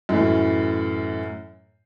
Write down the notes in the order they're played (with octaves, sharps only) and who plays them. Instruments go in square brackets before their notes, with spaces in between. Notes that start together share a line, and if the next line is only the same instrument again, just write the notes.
[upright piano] F#2 A2 E3